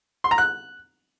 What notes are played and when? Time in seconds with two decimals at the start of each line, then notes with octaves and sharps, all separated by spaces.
0.24 C6
0.31 A#5
0.38 F#6